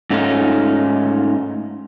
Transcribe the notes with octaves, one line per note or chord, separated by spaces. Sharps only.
G#2 A3 C#4 D#4 F4